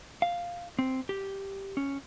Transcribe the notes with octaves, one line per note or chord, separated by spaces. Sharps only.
F5
C4
G4
C#4